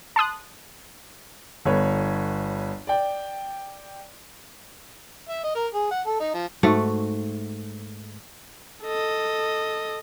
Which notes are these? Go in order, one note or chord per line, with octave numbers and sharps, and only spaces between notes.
A5 C6 D#6 F#6
G1 B4 C#5
D5 G5
E5
D#5
A#4
G#4
F#5
A4
D#4
F3
G#2 A3 F#4
A4 D#5